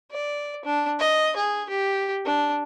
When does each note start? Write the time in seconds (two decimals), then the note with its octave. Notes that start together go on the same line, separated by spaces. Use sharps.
0.11 D5
0.65 D4
0.99 D#5
1.36 G#4
1.69 G4
2.25 D4